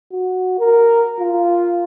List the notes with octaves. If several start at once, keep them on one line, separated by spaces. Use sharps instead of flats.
F#4
A#4
F4